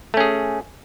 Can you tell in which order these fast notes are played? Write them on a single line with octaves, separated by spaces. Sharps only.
A3 C#4 G#4